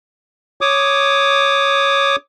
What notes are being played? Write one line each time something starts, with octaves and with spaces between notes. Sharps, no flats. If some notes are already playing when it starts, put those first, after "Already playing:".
C#5 D6 D#6